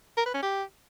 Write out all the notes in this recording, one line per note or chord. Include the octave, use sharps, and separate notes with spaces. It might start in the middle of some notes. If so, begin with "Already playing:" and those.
A#4
B4
C#4
G4